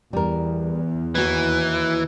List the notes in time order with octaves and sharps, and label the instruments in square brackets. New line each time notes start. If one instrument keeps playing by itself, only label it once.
[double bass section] E2 [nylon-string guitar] G3 A#4
[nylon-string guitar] D#2 F#4 [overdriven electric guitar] E3